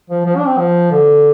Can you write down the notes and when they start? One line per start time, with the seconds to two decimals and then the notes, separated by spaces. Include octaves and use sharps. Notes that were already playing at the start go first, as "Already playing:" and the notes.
0.10 F3
0.26 F3
0.37 D4
0.47 C4
0.58 F3
0.91 D3